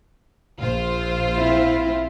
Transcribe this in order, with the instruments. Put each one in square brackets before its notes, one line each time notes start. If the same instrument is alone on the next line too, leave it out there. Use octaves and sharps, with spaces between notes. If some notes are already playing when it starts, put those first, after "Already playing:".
[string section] A#1 F4 C5
[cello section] C4 E4